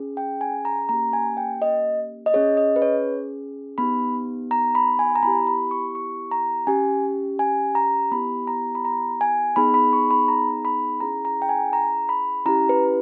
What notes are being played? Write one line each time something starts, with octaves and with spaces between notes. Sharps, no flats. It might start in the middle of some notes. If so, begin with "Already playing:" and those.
Already playing: C#4 G#4
G5
G#5
A#5
A#3 C#4 G4 A#5
G#5
G5
D#5
D#5
C#4 G#4 C#5
D#5
B4
C#5
B3 D#4 G4 B5
A#5
B5
G#5
A#5
B3 E4 G4 B5
B5
C#6
C#6
A#5
C#4 G4 G#5
G#5
A#5
B3 E4 G4 B5
A#5
B5
A#5
G#5
B3 D#4 G#4 B5
B5
C#6
B5
A#5
B5
C#4 E4 G#4 A#5
A#5
G5
G#5
A#5
B5
C#4 E4 G4 A#5
B4